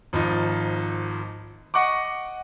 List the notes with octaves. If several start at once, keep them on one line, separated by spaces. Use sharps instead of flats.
G#1 F3 D#4
D#5 F#5 C#6 D6